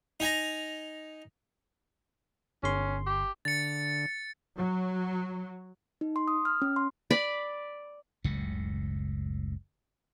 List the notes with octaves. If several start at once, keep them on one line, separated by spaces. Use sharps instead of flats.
D#4 G#5 A#5
G1 C#4 C6
G4
D3 A6 C#7
F#3
D#4
C6
D#6
F6
C#4
C6
D5 B5
F#1 C#2 A2 C#3